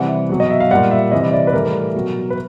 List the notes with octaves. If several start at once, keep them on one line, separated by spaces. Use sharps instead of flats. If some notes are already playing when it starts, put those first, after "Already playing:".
Already playing: C3 E3 G3 F#5
B2 F#3
D#5
E5
F5
A#2 G3 F#5
E5
C3 E3 G3 D#5
D5
B4
A2 E3 G3 A#4
B2 F#3
B4